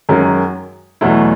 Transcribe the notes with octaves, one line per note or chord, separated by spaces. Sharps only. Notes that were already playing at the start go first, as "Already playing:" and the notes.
F#2 D#3 G#3 C#4 F#4
E2 B2 F#3 A3 E4